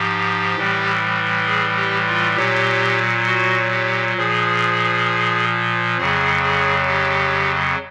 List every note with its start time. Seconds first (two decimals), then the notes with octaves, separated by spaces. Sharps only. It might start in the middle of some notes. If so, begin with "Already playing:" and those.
Already playing: G#2 F3 G4
0.56 A2 E3 G3
1.45 G#4
1.77 G4
2.07 F4
2.36 A#2 F#3 G4
3.27 F#4
3.72 G4
4.17 A#2 F3 G#4
5.98 F2 C#3 F#3 G#4
6.43 G#4
6.88 G4